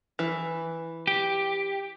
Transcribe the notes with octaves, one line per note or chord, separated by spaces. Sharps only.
E3
G4